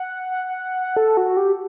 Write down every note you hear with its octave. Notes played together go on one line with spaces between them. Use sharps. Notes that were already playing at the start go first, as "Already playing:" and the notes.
Already playing: F#5
A4
F#4
G4